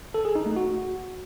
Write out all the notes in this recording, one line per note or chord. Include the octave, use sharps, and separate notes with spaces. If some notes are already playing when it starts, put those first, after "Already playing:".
A4
G#4
D#4
A3
F#4